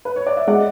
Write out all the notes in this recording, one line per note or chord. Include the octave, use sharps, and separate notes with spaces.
B4
C#5
D5
E5
G#3 D5 F#5